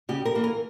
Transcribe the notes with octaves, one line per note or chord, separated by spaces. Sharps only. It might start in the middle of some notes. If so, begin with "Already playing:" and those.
C#3 G4
A#4
E3 A#3
A#4